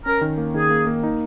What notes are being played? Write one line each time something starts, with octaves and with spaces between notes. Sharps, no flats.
C#4 A#4
D#3
A#3
D#3 G#4
A#3
A#3
D#4